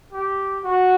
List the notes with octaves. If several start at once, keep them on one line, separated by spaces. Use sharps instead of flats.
G4
F#4